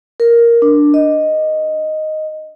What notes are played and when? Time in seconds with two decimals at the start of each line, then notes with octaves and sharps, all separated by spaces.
0.20 A#4
0.62 D4
0.94 D#5